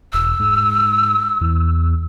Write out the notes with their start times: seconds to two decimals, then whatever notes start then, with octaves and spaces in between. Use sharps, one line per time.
0.13 E1 E6
0.40 G#2
1.41 E2